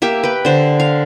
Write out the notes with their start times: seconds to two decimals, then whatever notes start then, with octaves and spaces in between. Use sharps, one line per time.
0.02 A#3 G4 E5
0.23 B4 G5
0.45 D3 C5
0.80 F5